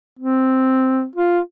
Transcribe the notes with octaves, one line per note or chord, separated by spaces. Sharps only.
C4
F4